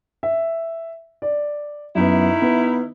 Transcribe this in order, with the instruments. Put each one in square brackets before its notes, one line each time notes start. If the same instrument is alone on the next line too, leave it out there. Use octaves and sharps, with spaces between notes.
[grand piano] E5
D5
[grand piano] F#2 B3 [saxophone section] D#3 E4
[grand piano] B3